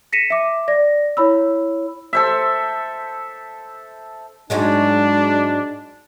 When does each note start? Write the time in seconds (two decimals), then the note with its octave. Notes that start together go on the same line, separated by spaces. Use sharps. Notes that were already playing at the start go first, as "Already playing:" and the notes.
0.13 A#6 B6 C#7 D#7 E7
0.30 E5 D6
0.68 D5 A#6
1.17 E4 C#5 B5 E6
2.13 A4 C5 E5
4.50 G#2 F#3 G#3 D4